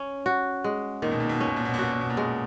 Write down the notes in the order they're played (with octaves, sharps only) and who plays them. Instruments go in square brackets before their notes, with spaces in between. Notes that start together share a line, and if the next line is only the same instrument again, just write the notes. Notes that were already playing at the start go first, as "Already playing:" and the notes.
Already playing: [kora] C#4
F#4
G#3
[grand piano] A#2 [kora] D#3
[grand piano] B2
A#2
B2
[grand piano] A#2 [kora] C#4
[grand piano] B2
A#2
B2
A#2
[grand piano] B2 [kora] F#4
[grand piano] A#2
B2
A#2
[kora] G#3